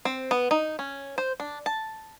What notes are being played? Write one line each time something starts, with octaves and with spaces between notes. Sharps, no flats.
C4
B3
D#4
C#4
C5
D4
A5